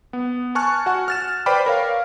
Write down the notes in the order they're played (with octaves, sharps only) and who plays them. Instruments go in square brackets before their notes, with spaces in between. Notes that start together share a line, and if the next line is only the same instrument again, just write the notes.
[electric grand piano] B3
G#5 A5 C#6 F6 F#6
F#4 F#5 G#5
F6 A6 E7
B4 C5 D5 G5 B5 D6
A#4 C#5 F5